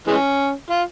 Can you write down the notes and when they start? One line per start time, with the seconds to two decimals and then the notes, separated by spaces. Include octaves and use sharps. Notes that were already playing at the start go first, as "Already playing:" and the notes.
0.07 E3 G#3 C#4
0.70 F4